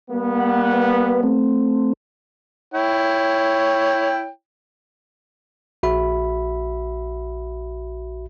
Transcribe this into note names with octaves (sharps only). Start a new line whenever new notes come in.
G3 A#3 B3
F#5
B4
A3 C4
E4 C#5 G5
A#1 F#4 E5 B5